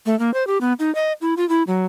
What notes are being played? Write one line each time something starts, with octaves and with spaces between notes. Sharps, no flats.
A3
A#3
C5
G4
B3
D#4
D#5
E4
F4
E4
F#3